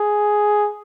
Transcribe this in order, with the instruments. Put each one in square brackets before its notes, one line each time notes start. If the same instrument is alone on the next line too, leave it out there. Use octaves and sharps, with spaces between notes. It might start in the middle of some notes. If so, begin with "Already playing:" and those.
Already playing: [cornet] G#4